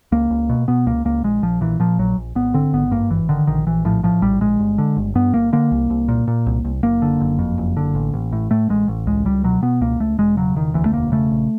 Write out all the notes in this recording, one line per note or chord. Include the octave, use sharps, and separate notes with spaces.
C#2 A#3
C#2
B2
B2 B3
C#2 A#3
C#2 A#3
A#1 G#3
A#1 F3
A#2 E3
A#2 F3
A#1 F#3
A#1
G#1 B3
D3 C4
G#1 B3
G2 A#3
G#1 E3
D3 D#3
A#1 D#3
A#1 E3
A2 F3
A2 F3
A#1 G3
A#1 G#3
G1
D3
G1
G2 B3
G1 A#3
D3 A#3
C2
C2
A#2
A#2
C2
C2
F#1 A#3
D3
F#1
F2
F#1
D3
A1
A1
A2
A2 A3
A1 G#3
A1
C#2 G#3
C#2 G3
B2 F#3
B2 B3
C#2 A#3
C#2 A3
E1 G#3
C#3 F#3
E1 D#3
D2 E3
A3
E1 A#3
C#3 A3
A#1